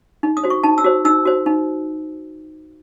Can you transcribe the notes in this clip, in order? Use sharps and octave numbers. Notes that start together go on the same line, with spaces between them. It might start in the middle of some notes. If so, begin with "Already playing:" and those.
D#4
D#6
F#4 C5
C#6
D#4 A5
E6
F#4 C5
D#4 E6
F#4 C5
D#4